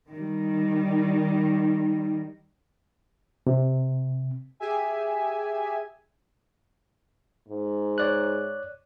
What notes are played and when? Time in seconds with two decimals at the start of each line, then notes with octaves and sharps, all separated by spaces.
0.11 D#3 G3
3.47 C3
4.60 G4 G#4 E5 G#5
7.48 G#2
7.98 C#5 D5 F#6